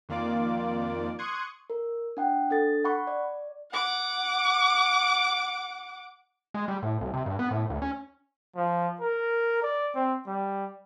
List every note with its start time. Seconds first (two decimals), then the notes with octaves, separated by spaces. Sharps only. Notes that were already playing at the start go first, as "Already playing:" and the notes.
0.09 F2 D#3 A#3 F4 D5 D6
1.19 C6 C#6 D#6 F#6 G#6 C#7
1.70 A#4
2.17 D4 F#5 G5
2.50 D4 A4 A6
2.84 F#5 B5 C#6
3.07 D5
3.71 F#5 D6
6.54 G#3
6.68 G3
6.83 A2
7.01 C2
7.13 C3
7.26 G2
7.39 B3
7.51 A2
7.70 D2
7.82 C#4
8.56 F3
9.00 A#4
9.63 D5
9.95 C4
10.27 G3